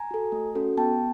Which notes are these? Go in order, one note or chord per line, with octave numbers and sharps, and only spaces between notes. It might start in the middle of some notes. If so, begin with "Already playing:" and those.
Already playing: G#5 A#5
F#4 A4
A3
C#4 F#4 A4
B3 G5 A5